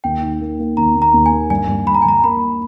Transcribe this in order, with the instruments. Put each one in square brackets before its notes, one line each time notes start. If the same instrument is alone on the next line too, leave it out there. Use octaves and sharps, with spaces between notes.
[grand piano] D#2 [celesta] G5
[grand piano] D#3
A#3
A#3
[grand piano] D#2 [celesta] A#5
[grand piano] D#2
[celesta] A#5
[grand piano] D#2
[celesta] G#5
[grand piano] A#3
[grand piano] G2 [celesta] G#5
[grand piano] G2
[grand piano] G2 [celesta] B5
[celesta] A#5
G#5
[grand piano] G2 [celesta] A#5
[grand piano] A#3 [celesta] B5